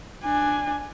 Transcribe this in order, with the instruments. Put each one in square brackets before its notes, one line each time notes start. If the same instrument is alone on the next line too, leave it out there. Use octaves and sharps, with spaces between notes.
[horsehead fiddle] D4 G#5